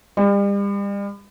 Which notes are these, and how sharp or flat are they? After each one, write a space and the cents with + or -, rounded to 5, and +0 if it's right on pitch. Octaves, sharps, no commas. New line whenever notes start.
G3 +40